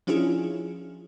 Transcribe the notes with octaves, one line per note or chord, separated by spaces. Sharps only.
F3 C#4 D4 E4 F4 G#4